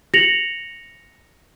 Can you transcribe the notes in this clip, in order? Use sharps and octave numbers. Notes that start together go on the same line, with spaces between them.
A#6 C#7 F7 F#7